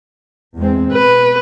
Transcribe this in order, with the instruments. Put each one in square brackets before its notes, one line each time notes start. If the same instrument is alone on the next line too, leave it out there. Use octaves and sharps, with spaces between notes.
[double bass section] E2 G#3 C4
[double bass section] B2 [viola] B4